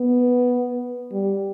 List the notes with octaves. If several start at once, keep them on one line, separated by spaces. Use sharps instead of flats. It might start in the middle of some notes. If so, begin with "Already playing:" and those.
Already playing: B3
G3